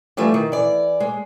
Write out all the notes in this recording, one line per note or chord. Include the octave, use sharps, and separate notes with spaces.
E3 F3 G3 A3
D#3
E3 D5
G#3